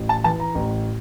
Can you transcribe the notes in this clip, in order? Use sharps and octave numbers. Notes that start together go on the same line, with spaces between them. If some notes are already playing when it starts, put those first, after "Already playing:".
Already playing: A1
A5
E3 A5
A#5
A1